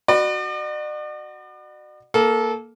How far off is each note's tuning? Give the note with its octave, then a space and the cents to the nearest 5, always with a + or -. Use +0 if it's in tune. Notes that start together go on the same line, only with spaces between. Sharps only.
F#4 +0 D5 +45 B5 +5
A#3 +0 A4 -20